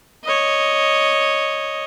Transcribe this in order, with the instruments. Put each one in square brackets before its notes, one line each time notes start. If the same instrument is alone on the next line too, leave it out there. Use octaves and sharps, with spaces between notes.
[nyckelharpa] C#5 D#5